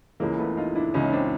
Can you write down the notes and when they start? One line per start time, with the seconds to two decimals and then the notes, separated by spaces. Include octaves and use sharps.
0.20 C#2 C#3 E3 G#3 A#3
0.38 A3 B3
0.57 D#4 F4
0.75 D4 E4
0.94 C#2 C#3 E3 C#4 D#4
1.05 D#4
1.13 C4 D4